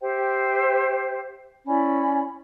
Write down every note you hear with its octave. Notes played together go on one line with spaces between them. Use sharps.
G4 C5 E5 G5
C#4 E4 D5 B5